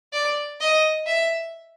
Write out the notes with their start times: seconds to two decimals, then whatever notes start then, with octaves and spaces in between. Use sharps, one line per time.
0.13 D5
0.61 D#5
1.06 E5